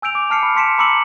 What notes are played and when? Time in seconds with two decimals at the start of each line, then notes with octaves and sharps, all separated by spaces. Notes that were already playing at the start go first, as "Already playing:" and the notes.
0.02 G#5 E6 G6 D7 F7
0.15 D6
0.30 A5 F6 C7 C#7
0.43 B5 C#7
0.55 A5 C6 B6 C#7 D7 E7
0.78 A#5 B5 D6 E6 C#7 F#7